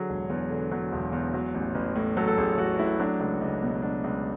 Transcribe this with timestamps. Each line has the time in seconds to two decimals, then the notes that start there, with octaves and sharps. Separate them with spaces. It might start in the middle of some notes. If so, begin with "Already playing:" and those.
Already playing: D3 F#3 G#4
0.09 E1
0.30 E2
0.50 D3
0.72 F#3
0.92 E1
1.13 E2
1.34 F#3
1.54 A1
1.75 A1
1.95 A2
2.17 F#3 A4
2.28 A4
2.37 A1 G#4
2.58 A1 F#4
2.78 A2 E4
3.00 F#3 D4
3.20 C#2
3.41 C#2
3.62 B2
3.82 F#3 D4
4.04 C#2